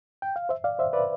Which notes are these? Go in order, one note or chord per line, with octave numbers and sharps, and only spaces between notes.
G5
F5
C5 E5
D5 F5
C5 E5
B4 D5